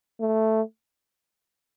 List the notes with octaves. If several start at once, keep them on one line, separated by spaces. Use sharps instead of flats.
A3